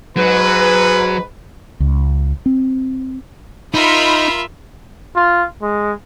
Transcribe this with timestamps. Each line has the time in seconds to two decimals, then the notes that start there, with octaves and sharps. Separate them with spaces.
0.17 G#2 F#3 B4
1.80 C#2
2.46 C4
3.74 D#4 F4 A#4 E5 B5 C6
5.16 F4
5.62 G#3